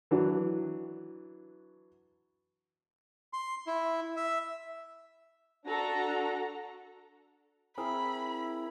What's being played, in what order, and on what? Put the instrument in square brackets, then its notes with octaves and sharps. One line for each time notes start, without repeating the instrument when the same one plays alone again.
[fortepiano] E3 F#3 D4 F#4
[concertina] C6
E4
E5
[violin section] D4 F#4 A4 A#5
[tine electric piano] C4 G#4 A#4 [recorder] E4 [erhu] B5